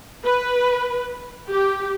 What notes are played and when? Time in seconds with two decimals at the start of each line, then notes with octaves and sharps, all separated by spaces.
0.24 B4
1.49 G4